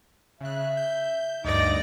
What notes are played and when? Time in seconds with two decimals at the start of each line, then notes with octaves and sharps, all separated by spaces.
0.41 C#3 E5 F#6
0.77 G6
1.45 D2 G2 D#4 D5 A#6